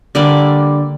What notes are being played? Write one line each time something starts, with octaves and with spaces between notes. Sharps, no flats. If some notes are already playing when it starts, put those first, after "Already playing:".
D3 G3 A#3 D5